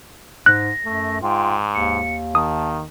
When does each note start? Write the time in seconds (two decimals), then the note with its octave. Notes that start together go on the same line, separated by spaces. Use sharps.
0.46 G#2 F#6 A#6
0.85 F#2 A3
1.22 G#2 F4 G5
1.75 D#2 C#7
2.35 D#3 A5 D#6